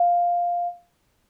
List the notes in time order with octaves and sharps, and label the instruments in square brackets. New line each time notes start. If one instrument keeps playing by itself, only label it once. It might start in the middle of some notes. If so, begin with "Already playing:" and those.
Already playing: [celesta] F5